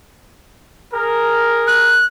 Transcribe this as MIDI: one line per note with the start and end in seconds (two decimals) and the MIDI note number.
0.94 2.02 68
0.94 2.02 70
1.67 2.05 90